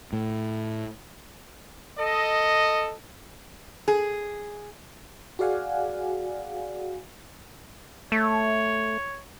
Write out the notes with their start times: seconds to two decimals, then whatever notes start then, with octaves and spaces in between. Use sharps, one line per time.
0.13 A2
1.99 A4 D#5
3.88 G#4
5.39 F#4 G#4 D5 F5 F#5 G#5
8.12 A3 C#5